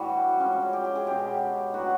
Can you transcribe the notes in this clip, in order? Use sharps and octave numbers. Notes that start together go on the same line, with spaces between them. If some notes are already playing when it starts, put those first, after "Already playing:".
Already playing: A2 E3 G3 D4 F#4
F3 G#3 C#4
G4
G4
G#4
B2 G#3 C#4 G4
A2 F#3 B3 D4 F#4